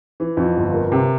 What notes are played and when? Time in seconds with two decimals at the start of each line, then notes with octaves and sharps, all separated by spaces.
0.20 E3
0.37 F2
0.56 G1
0.74 A#3
0.92 C3